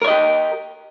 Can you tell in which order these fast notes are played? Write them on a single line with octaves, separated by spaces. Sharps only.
A#4 C#5 D#5 G4